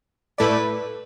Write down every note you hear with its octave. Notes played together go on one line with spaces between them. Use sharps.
A2 A3 E4 A4 B4 D5